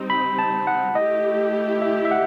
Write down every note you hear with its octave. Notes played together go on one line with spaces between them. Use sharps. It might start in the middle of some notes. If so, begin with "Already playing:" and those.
Already playing: G3 C4 D#4
B5
A5
F#5
A3 E4 G4 D#5
E5
E5
F#5